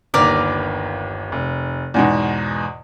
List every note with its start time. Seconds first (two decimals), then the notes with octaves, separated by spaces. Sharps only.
0.14 G1 D#2 A#4 B4 D5
1.32 F1
1.94 E2 G#2 B2